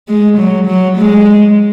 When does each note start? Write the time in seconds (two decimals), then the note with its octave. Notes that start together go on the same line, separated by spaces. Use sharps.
0.08 G#3
0.37 F#3
0.67 F#3
0.97 G#3